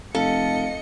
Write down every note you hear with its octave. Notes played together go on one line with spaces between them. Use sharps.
F1 A4 D#5 F5 C#7